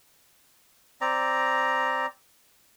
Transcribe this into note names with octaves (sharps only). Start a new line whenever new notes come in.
C4 D5 A#5